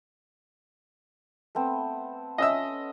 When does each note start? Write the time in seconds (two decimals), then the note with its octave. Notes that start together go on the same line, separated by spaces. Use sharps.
1.55 A3 B3 C4
2.38 C#4 D#5 E5 E6